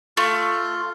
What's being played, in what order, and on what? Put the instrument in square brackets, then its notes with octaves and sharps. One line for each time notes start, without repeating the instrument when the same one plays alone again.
[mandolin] A3 [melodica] F4